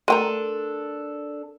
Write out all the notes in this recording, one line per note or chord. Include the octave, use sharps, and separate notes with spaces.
A3 D4 A4 A#4 G5 A#5 C6 D#7